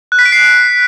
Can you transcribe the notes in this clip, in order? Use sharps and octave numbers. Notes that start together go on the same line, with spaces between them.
F#6
B6
D7
C7